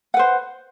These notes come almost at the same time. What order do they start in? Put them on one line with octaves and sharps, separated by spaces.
F#5 B4 C5